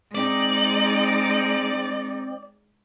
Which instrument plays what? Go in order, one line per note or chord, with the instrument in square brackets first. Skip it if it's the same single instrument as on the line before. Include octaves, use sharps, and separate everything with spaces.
[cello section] G#3 D#4 [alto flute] C4 [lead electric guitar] D5